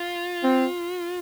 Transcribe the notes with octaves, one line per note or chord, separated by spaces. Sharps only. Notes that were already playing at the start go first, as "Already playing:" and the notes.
Already playing: F4
C4